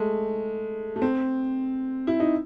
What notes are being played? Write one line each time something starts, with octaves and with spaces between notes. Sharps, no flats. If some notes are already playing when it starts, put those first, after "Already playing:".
Already playing: G#3 A3
A3
C4
E4
D#4